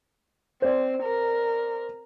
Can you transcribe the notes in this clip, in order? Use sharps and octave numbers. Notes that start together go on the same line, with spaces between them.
C4 C5 D5
A#4